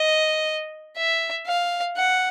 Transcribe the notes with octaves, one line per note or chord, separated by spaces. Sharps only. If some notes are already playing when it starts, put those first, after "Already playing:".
Already playing: D#5
E5
F5
F#5